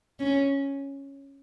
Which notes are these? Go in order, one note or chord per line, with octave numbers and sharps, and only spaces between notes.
C#4